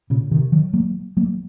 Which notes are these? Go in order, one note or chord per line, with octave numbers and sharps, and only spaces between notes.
A#2 C#3
C3 D#3
D#3 F#3
F#3 A#3
F#3 A#3